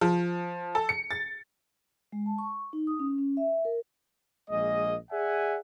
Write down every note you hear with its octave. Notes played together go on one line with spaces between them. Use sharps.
F3
A4
C#7
A6
G#3
A5
C#6
D#4
D#6
C#4
C#4
E5
A#4
A#1 G#3 A#3 D#5
G#4 D5 E5 F#5 G#5